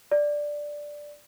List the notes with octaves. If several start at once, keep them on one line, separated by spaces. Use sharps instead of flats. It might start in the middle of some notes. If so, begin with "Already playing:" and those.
D5